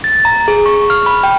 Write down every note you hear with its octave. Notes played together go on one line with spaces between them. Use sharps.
A6
A#5
G#4
C#6
F6
B5
G5